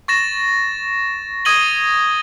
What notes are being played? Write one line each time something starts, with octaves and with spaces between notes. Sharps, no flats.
C#6 A6 A#6 E7
D#6 G#6 A#6 D#7 F#7 G7